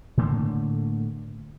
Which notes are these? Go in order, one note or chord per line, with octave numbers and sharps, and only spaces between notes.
A2 D3 A3 A#3